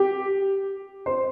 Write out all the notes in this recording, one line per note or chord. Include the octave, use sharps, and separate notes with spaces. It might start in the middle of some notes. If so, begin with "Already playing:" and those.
Already playing: G4
C5